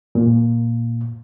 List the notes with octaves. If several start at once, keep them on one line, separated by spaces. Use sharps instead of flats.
A#2